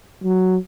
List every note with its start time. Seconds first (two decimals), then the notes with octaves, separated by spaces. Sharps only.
0.24 F#3